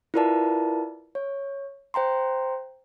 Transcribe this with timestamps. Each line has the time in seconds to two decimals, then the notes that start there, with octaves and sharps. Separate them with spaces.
0.14 E4 F4 A#4 B4 D5 A5
1.15 C#5
1.94 C5 G5 A#5 C6